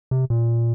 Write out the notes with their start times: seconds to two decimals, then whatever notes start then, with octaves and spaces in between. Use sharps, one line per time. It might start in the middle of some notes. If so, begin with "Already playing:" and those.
0.11 C3
0.30 A#2